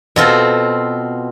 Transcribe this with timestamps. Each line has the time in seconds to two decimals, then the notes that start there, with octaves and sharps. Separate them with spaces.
0.16 B2 C4 F4 A4